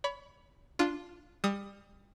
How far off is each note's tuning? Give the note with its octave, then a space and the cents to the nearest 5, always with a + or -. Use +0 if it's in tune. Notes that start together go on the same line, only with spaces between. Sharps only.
C#5 +35 B5 +5
D4 +0 F4 +0
G3 +30 D#6 +20